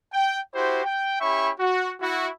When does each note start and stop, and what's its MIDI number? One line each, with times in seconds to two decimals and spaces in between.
0.13 0.40 79
0.54 0.80 64
0.54 0.80 66
0.54 0.80 67
0.54 0.80 72
0.85 1.17 79
1.21 1.50 61
1.21 1.50 64
1.21 1.50 67
1.21 1.50 76
1.21 1.50 83
1.21 1.50 85
1.59 1.91 66
2.01 2.28 64
2.01 2.28 66